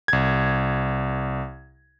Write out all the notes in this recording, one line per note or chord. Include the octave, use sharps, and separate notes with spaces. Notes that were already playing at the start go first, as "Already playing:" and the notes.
C2 G#6